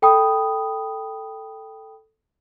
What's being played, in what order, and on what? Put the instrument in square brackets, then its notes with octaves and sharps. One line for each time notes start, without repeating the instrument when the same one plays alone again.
[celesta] A4 G5 B5 D#6